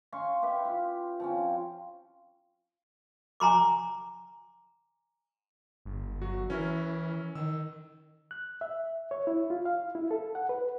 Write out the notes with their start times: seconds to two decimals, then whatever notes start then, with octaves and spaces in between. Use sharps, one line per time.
0.13 C#4 F5 C6 C#6
0.42 G4 B4 E5
0.65 F4
1.20 F3 C4 C#4
3.40 G#5 A#5 C6 D6
5.85 G1
6.21 F#3 F#4
6.50 E3 C#4 E4 A#4
7.35 D#3 E6
8.31 F#6
8.61 E5
9.11 C#5
9.27 E4
9.50 F4
9.65 F5
9.95 E4
10.11 A4
10.35 F#5
10.49 B4